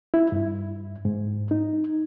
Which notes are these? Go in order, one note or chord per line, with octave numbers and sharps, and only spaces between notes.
E4
G2
G#2
D#4